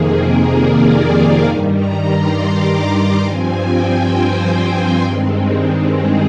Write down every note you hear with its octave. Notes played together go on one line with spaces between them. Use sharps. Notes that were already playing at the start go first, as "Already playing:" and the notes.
Already playing: F2 C3 D#3 A#3 G#4
A#4
D5
F5
F5
G2 D#3 G3 G#5
A#5
C6
D6
C6
G2 F3 C4 G#5
G5
C5
G2 D#3 G#3 C4
G#4